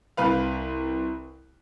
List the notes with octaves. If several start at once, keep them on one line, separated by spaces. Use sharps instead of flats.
C2 B4 F5